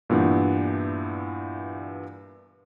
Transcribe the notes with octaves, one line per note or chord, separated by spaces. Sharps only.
G2 A#2 E3 B3 D4